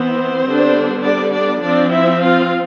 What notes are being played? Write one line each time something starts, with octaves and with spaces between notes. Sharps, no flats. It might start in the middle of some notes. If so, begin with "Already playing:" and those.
Already playing: E3 B3 C4 C5
D3 G3 B3 D4
D4 D5
D4 D5
F3 C4 D4 D5
E4 E5
F4 F5